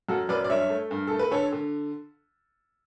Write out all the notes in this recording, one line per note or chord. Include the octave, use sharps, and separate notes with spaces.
F#2 F#4 A4
F#2 B4 D5
D5
G2 C#5 E5
A3
G2
A3 A4
B4
D3 A4 C#5
D3